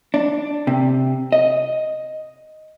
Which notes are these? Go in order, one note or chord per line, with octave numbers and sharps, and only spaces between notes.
D4
C3
D#5